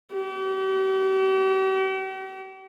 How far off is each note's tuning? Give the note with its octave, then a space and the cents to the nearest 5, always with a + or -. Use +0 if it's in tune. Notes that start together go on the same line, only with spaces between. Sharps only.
G4 -45